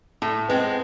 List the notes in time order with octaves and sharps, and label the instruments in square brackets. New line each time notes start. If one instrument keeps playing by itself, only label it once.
[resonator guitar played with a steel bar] A2 [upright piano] A3
[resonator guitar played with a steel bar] G#3 C4 [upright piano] B3